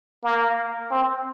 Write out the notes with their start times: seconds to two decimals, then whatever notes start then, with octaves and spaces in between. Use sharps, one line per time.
0.24 A#3
0.91 C4